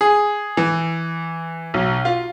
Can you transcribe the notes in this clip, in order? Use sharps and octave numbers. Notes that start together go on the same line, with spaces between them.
G#4
E3
B1
F4